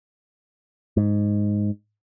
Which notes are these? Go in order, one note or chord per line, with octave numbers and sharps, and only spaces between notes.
G#2